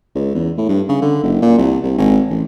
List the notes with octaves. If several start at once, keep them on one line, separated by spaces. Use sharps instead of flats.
C#2
E2
A2
G2
C#3
D3
F#1
A#2
C2
C2
G#1
A1